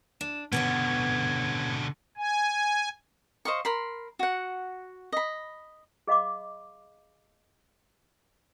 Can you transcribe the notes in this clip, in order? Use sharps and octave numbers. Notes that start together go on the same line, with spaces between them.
D4 E7
B2 D3 B3 C#4 C#5 G#6
G#5
C5 D#5 F5 C#6
A#4 B5 C6
F#4 F#5
D#5 B5
G#4 D#5 F5 B5 D6